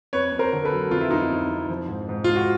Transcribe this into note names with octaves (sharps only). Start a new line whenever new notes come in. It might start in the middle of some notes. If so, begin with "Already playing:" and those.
F2 B4 C#5
F2
A#4 C5
D3
A4 B4
F#3
F2 F4
E4
F2 D#4 F4
F2
F2
F3
G#2
G#2
G#2 F4
F#4